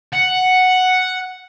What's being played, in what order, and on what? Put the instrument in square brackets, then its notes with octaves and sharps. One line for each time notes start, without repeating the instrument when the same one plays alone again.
[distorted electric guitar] F#5